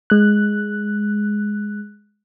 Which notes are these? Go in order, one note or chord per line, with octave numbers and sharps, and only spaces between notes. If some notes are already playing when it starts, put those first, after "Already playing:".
G#3 F#6